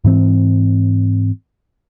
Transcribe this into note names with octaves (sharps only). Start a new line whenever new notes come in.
G#2 E3 C4